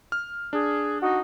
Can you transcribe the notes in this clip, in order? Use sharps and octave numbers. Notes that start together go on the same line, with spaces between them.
F6
D4 G#4
D#4 F#4